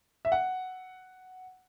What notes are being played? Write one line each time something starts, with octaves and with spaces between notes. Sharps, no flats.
E5
F#5